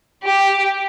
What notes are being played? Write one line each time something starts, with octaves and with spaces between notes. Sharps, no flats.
G4